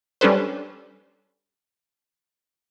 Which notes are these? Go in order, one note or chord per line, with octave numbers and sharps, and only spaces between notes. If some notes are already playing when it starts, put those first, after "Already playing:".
G3 C#4 D4 A4 B4 C5